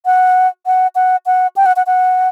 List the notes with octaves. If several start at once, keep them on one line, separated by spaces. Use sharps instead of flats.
F#5
F#5
F#5
F#5
G5
F#5
F#5
F#5